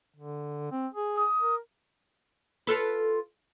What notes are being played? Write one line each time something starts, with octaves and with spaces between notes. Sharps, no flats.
D3
C4
G#4
D#6
A#4
F4 A4 B4